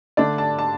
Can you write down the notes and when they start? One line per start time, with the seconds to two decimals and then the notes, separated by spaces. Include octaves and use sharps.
0.17 D3 A3 D4 D5
0.38 A5
0.59 A5